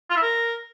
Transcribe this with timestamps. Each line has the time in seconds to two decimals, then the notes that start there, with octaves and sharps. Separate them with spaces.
0.10 F4
0.16 E4
0.22 A#4